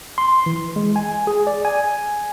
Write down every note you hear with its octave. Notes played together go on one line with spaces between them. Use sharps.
C6
E3
G#3
G#5
G#4
D5
G#5